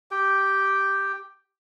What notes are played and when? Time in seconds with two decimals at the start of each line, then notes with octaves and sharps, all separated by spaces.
0.11 G4 G5